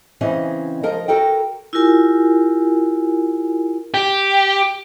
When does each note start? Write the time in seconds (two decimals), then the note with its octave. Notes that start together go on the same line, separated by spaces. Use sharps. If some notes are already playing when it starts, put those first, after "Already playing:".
0.21 C#3 E3 C4 C#4 D#5
0.83 F3 A#4 D#5
1.08 F#4 A4 A#4 G5
1.73 E4 F4 G4 A#4 G#5
3.94 G4